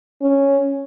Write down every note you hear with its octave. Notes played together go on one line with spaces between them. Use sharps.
C#4